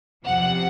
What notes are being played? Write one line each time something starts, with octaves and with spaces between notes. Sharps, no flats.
E2 C3 F3 F#5